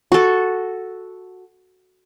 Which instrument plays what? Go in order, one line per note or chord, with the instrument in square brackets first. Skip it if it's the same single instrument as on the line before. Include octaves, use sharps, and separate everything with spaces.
[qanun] F#4 A4